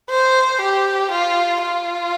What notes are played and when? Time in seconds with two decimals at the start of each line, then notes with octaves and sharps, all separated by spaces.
0.10 C5
0.62 G4
1.12 F4
1.62 F4